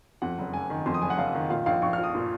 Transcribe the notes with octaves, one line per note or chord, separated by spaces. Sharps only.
F2 F#5
F#1
F#1 G#5
D#3
F2 C6
D#6
F#1 G#5
F#5
F#1 F5
D#3
A#2 F5
A#1 F5
A#1 C#6
F6
F3
D#6
A#2